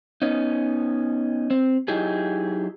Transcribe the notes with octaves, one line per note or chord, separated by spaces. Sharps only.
B3 C#4 D#4
C4
F#3 D#4 E4 G4 G#4